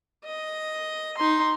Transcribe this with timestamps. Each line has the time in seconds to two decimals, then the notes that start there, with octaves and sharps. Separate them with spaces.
0.25 D#5
1.17 D#4 C6